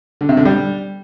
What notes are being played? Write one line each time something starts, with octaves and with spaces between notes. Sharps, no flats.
D3
C3
D3
G3